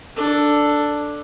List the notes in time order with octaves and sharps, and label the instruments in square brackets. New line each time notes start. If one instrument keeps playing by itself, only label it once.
[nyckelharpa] D4 A4